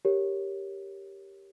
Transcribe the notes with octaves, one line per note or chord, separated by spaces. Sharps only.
G4 A#4 C#5